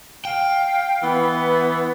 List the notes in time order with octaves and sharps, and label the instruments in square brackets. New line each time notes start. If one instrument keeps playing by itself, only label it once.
[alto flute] F5 [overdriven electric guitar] G5
[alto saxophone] E3 [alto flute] B3